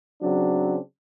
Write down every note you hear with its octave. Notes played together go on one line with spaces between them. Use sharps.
C#3 F#3 C4 D4